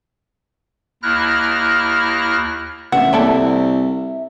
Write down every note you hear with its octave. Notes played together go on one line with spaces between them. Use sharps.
D#2 E4 F6 F#6 A#6
A1 E5 F#5
C2 A#3 E4 A4